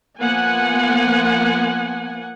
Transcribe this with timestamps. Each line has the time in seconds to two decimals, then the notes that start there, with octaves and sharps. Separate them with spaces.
0.18 F3 A#3 B3 F#5 G#5